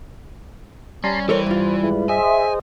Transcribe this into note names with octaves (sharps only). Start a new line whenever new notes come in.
G3 C#4 A5 A#5 C6
E3 A4 A#4 C5 C#5
G2 F4
G#3 E4 B4
G#4 C5 D#5 E5 G#5